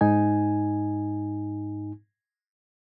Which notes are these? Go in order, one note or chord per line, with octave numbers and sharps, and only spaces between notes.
G#2 D#4 G#5